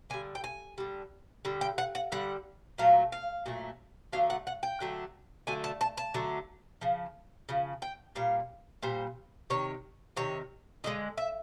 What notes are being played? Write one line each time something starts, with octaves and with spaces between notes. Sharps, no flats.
D3 G3 G#5
G5
G#5
D3 G3
D3 G3
G5
F#5
F#5
D3 G3 F#5
A#2 F#3 A3 F5
F5
A#2 F#3 A3
D3 F#3 A3 F5
F#5
F#5
G5
D3 F#3 A3
D3 F#3 A3 G#5
A5
A5
A5
D3 F#3 A3
C#3 F3
C#3 F3
G5
A#2 G3 F5
A#2 G3 C5
C3 D#3 C#5
C3 D#3 C#5
D3 F3 G#3 D#5
E5